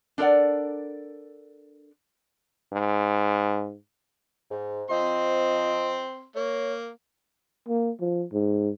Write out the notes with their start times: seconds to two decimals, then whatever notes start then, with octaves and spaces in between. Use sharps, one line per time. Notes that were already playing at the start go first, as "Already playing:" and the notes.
0.18 D4 A4 A#4 D5 F#5
2.73 G#2
4.51 G#2
4.90 F3 C4 D#5 C6
6.36 A#3 C#5
7.69 A#3
8.01 F3
8.33 G#2